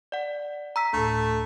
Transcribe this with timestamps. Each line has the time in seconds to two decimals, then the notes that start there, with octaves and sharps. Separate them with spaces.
0.12 D5 F#5
0.76 A#5 E6 B6
0.93 D2 A2 A3